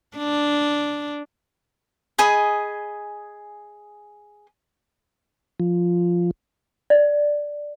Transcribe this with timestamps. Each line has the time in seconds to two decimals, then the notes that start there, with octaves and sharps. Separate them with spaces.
0.17 D4
2.18 G#4 D#5 G#5 B5
5.60 F3
6.90 D5